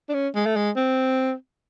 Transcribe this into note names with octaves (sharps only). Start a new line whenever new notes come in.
D4
C#4
G#3
A3
G#3
C4